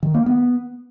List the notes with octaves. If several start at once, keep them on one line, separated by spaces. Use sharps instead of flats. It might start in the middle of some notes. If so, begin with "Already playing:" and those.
D#3
A#3
B3